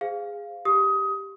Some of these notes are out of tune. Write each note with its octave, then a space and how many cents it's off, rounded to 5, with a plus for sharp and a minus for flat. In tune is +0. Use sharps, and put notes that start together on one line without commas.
G#4 -15 C5 -25 F5 +0
G4 +0 D#6 +20